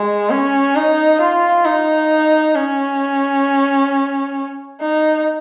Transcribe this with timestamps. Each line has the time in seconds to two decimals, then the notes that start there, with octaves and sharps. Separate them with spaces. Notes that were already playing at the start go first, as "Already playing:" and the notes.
Already playing: G#3
0.30 C#4
0.76 D#4
1.21 F4
1.65 D#4
2.56 C#4
4.81 D#4